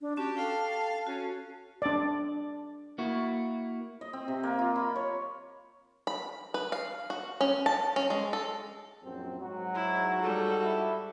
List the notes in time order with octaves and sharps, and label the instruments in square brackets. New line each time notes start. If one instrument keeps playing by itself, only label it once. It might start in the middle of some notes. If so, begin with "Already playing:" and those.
[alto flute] D4
[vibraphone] C#4 F#4 [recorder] G4 [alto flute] A5
[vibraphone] A4 G5 [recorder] F5
[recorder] C#4 [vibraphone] F#4 A4
[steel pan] D4 D5
[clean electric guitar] A#3 E4 F#4
[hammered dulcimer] D#5
C4
C3
A#3
F4
B5
C#5
[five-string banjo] B5
B4
F5
F#4
C#4
A5
C#4
G#3
A4
[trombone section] A#1 F#2 C4
[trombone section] G#2 F#4 [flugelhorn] F#3
[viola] E4
G3 A4
[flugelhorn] E4